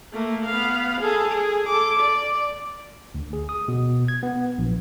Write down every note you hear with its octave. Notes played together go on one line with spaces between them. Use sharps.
A3 A#3
B3 F5
G#4 A4
G#4
A4 D6
D5
D2
G#4
D#6
B2
G#6
B3
A#1